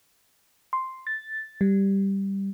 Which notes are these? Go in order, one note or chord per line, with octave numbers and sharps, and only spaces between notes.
C6
A6
G3